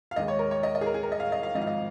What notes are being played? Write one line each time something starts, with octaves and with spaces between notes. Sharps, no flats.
F5
D#2 D#3 G#3 D#5
C#5
A#4
C#5
D#5
D#5
G#4
A#4
G#4
A#4
D#5
F5
D#5
F5
G#1 G#2 F3 D#5
F5
D#5